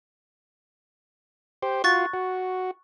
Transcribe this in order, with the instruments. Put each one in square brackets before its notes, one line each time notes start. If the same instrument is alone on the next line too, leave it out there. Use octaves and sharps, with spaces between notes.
[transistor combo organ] G4 C5
[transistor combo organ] F4 F#4 [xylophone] C#6 F#6 A6
[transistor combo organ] F#4